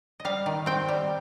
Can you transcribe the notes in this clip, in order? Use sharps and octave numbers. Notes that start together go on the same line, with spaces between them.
D#5
G3 F5
D#3
C4 G5
G3